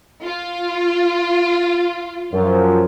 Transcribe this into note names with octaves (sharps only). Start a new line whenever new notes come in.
F4
F#2 F3